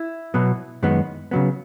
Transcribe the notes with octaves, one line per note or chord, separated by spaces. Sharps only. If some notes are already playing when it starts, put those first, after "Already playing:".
Already playing: E4
B2 F#3 B3
F#2 D#3 G#3 B3
C#3 F#3 B3